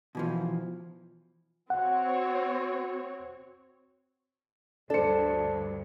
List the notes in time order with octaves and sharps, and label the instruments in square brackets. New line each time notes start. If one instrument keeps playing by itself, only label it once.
[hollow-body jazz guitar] B2 E3 F3
[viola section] C4 F#4 C#5 [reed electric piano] F#5
[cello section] D2 G2 [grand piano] D4 C#7 [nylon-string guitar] A4 C5